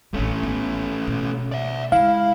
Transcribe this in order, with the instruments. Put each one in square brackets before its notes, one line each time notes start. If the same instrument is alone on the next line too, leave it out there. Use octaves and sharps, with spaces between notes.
[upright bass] A1 D4 [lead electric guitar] A3 C#4
[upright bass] B3
B2
[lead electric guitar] D5 E5
[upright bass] C#3 G#3 [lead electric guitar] E4 [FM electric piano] F5